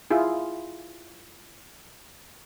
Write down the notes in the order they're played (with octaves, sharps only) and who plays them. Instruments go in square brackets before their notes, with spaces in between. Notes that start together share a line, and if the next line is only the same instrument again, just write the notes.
[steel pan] E4 F4 G#4